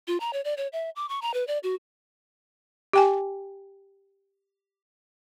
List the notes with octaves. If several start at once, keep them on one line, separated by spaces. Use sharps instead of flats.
F4
A#5
C#5
D5
C#5
E5
D6
C#6
A#5
B4
D5
F#4
G4 G5 G#5